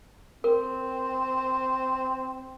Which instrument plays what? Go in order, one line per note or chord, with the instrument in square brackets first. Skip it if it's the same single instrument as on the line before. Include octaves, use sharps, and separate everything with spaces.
[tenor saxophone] C4 [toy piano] A#4